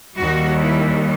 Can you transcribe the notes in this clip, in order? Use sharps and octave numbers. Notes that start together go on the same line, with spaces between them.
D#2 D#3 G3 F#4
E4